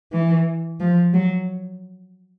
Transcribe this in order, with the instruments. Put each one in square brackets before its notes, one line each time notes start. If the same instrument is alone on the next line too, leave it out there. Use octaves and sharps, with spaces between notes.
[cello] E3
F3
F#3